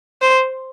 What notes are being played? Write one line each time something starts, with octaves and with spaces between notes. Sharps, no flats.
C5